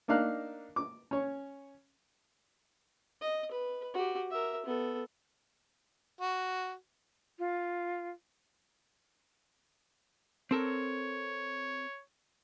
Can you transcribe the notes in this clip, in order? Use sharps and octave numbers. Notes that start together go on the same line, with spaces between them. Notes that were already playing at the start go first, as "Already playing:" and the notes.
A#3 D4 D#4 F5 F6 F#6
D6
C#4 C#5
D#5
B4
F#4 G4
A#4 E5
B3 A4
F#4
F4
C4 A4 A#4 C#5